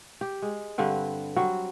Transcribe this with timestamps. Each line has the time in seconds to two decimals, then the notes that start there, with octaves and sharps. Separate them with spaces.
0.21 G4
0.42 G#3
0.78 G2 D3 C4 B4
1.36 F#3 G3 C4 F#4